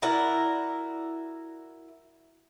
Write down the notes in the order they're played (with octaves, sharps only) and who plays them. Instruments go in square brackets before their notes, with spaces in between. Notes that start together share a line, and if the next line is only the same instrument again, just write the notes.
[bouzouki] E4 F#4 A#4 D5